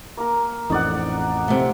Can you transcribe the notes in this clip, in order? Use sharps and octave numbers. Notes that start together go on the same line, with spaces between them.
A#3 A#4
A1 F2 D#4 D5 F#5
C3 A3